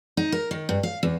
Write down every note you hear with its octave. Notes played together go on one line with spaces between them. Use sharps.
D#4
A#4
D#3
G2
F5
E2